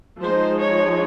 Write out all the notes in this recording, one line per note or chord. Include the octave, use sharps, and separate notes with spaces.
F3 G#3 D#4 C5
C#5